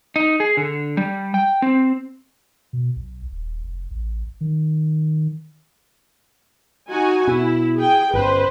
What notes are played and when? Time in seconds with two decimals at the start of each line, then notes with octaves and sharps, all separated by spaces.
0.16 D#4
0.40 G#4
0.57 D3
0.97 G3
1.34 G5
1.62 C4
2.73 B2
2.96 B1
3.32 D#1
3.64 F1
3.91 A1
4.41 D#3
6.90 D#4 F#4 G#5
7.27 B2 E4
7.78 G#4 G5
8.13 G1 C#4 B4 C5